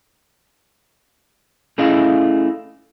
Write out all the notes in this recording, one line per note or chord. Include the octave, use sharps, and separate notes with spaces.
A3 C#4 E4 G#4 D#5 F5